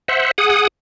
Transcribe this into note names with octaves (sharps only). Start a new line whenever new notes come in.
C5 E5 F#5
G#4 F#5 D#6